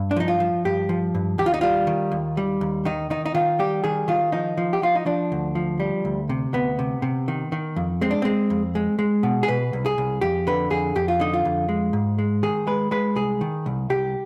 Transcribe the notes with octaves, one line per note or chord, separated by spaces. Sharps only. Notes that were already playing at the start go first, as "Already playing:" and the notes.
Already playing: G2
D4
F3 D#4
F4
F3
G2 G4
F3
G2
D#2 G4
F4
D#4
G3 F4
D#3
D#2
G3
D#2
D#3 D#4
D#3 D#4
D#4
D#3 F4
G3 G4
D#3 G#4
D#3 F4
F3 D#4
F3
G4
F3 F4
D#4
F3 D4
D2
F3
G3
D2
C3
D2 B3
C3
C3
D#3
D#3
F2
G#3 C4
D4
G#3 C4
F2
G#3
G#3
B2
G#4
B2 B4
C2
G#4
C2
F2 G4
D3 B4
F2 G#4
F2 G4
F4
D3 D#4
F4
F2
G#3
G#2
G#3
D#3 G#4
G#3 B4
G#3 B4
C2 G#4
D#3
C2
C2 G4